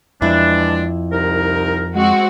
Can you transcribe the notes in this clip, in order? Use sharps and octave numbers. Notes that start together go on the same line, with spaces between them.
F2 E3 G#3 D4 E4
C2 D#4 A#4
G#3 C4 F#4